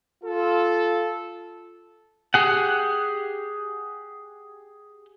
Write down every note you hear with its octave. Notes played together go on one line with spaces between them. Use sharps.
F4 A4
G4 G#4 F#5